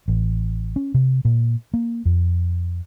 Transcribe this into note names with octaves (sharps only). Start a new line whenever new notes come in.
A1
C#4
C3
A#2
A#3
F2